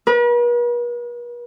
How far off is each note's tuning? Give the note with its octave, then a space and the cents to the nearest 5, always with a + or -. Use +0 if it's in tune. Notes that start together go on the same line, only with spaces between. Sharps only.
B4 -45